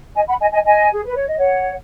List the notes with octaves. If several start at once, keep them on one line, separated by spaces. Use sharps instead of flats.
D#5 G#5
F#5 B5
D#5 G#5
D#5 G#5
D#5 G#5
G#4
B4
C#5
D#5
C#5 F#5